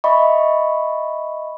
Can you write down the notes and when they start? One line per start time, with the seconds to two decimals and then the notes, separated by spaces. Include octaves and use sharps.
0.04 D#5 E5 B5 C#6